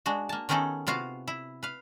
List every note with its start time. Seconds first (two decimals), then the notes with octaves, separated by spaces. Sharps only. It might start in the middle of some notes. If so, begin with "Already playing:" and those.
0.06 G#3 D4 F#4
0.29 A#3 A5
0.49 D#3 B3 C#4 D#4 G#4 A4
0.87 C3 B3 F4 F#4 F5
1.28 E4
1.63 B4 F5